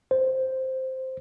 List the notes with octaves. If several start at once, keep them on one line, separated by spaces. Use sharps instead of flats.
C5